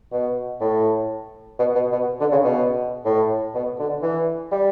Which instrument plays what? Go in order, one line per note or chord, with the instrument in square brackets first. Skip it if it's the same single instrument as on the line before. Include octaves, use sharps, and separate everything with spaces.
[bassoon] B2
A2
B2
B2
B2
D3
C#3
B2
A2
B2
D3
E3
G3